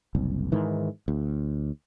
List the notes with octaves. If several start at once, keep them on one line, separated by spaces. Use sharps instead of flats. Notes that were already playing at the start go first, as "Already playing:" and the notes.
F#1 C2
G#2 D#3 E3
D2